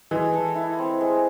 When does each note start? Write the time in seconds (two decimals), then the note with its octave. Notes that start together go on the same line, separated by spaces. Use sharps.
0.11 E3 G#3
0.33 A4
0.55 E4
0.79 C4
1.01 G#3